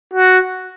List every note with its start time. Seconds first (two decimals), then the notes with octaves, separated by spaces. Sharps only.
0.13 F#4